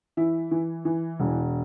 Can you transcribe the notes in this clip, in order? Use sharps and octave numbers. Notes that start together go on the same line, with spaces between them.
E3 E4
E3
E3
E1